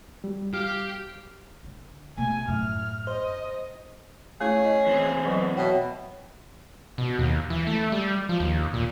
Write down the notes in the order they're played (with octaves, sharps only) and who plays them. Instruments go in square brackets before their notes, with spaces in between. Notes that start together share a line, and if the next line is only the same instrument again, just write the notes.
[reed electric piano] G3
[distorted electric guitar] G4 [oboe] F5
[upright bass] D3
[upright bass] B2 A3 [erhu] G#5
[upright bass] F#2 [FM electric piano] A2 [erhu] F6
[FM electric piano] C5 [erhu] D#5
[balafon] A3 E4 [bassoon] C#4 [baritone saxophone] G#4
[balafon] D#5
[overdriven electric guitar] E3 C4
[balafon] F#3 D#5 [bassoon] B3
[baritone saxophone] B2 [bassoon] F#3 [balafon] E5 G5
[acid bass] B2
D#2
E3
A3
G3
F3
D#2
A#2